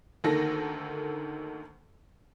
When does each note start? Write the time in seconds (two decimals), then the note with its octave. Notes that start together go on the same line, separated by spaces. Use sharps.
0.24 D2 D#3 A#3 A4 A#6